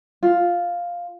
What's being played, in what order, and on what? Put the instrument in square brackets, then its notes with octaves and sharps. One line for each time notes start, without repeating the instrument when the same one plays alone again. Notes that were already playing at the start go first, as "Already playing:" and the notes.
[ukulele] F4